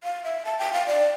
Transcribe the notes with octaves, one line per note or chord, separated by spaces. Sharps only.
F5
E5
A5
G5
F5
D5